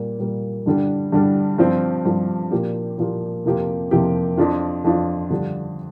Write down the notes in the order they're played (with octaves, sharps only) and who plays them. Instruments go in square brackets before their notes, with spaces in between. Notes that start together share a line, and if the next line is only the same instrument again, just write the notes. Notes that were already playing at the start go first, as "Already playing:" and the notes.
Already playing: [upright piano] A#2 G3 A#3
A#2 G3 A#3
G2 D3 G3 D4
G2 D3 G3 D4
G2 F3 C4
G2 F3 C4
A#2 F3 A#3 G4
A#2 F3 A#3 G4
F2 C3 F3 A#3 G4
F2 C3 F3 A#3 G4
F2 F3 D4 F4
F2 F3 D4 F4
G2 D3 F3 D4 G4